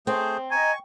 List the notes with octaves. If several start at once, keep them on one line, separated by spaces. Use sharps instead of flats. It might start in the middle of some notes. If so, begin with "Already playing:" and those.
A3 C4 G#4 C5
D#5 G#5 A#5 C#6